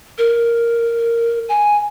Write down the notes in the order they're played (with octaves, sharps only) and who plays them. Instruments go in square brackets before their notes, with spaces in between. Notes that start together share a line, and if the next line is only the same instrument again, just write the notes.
[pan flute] A#4
G#5